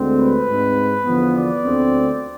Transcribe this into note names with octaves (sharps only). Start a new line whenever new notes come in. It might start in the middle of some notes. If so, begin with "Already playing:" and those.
Already playing: D2 D3 G#3 C4
B4
G#2 G#3 C4
E2 D3 F3 B3
D5
D2 D3 A3 C4